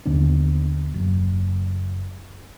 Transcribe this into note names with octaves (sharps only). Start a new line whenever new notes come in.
D#2 D3 B3 D4
F#1